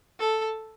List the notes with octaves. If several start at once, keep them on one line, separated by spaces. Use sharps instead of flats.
A4